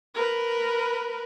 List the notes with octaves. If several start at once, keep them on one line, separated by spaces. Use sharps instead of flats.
A#4 B4